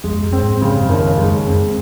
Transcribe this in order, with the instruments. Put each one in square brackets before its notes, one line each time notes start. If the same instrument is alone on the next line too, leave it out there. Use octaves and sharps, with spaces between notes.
[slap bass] F2 [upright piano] G#3
[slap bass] F#2
[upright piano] C4
[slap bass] G#2
[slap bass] G#2 [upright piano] C#3
[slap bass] F#2
[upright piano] D#2
[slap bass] F2
[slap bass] F#2 [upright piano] G#3
[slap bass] F#2 [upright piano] C4